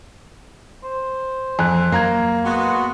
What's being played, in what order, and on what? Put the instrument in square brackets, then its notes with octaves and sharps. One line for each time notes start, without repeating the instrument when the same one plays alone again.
[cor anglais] C5
[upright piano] F2 [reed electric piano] G#5 F#6
[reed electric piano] F#2 A#5 G#6 [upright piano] A#3
[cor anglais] G#3 [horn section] B3 F#4